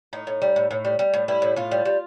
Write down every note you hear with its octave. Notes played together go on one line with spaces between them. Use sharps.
A2 D#4
A2
G3
A2
A2
G3
G3
A2
G3 E4
A2
A2 F4
G3
G3